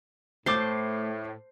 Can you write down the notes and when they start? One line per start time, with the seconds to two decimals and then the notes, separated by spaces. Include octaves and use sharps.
0.46 A2 A3 C5 A5 D6 C7